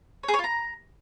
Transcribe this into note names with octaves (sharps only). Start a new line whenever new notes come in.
C#5
G#4
C#5
F4
A#5